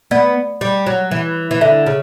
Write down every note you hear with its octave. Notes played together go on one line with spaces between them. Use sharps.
B3 D5
G3
F#3
E3
E3
D3 E5
C#3